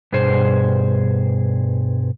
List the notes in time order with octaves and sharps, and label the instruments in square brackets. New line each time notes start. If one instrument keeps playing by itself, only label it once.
[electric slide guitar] G2 B2 G#4 C5